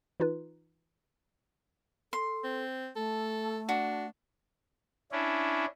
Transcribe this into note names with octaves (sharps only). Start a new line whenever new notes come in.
E3 D#4 F4 B4
A4 C6
C4
A3 A4
D4 F#4
C#4 D4 E4